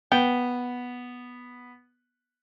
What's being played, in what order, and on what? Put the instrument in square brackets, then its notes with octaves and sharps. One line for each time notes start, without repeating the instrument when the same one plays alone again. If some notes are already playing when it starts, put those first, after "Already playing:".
[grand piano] B3 [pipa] G5